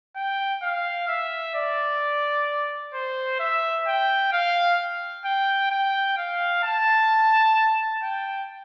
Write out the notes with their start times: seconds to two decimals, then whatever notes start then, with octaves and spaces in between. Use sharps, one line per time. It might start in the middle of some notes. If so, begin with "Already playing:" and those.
0.16 G5
0.62 F5
1.08 E5
1.55 D5
2.94 C5
3.39 E5
3.87 G5
4.32 F5
5.25 G5
5.71 G5
6.18 F5
6.64 A5
8.03 G5